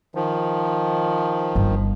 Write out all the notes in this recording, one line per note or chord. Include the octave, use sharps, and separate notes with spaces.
D#3 F3
G1 G3